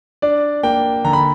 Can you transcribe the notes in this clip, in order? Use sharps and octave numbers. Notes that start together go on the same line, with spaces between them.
D4 D5
A#3 G5
D3 A#5
B5